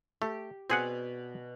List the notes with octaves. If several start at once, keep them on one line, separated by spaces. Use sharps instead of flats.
A3 G4
B2 C4 G#4 D5 F#5 G#5